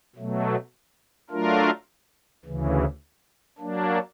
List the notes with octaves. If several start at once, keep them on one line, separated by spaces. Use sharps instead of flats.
B2 F#3 A3
F#3 A3 D4 F4 A#4
D2 C#3 E3
F#3 A#3 D4